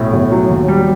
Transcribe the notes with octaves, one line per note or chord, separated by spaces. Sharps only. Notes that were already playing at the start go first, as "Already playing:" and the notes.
Already playing: B1 A2
B1
F#3
D#2
G3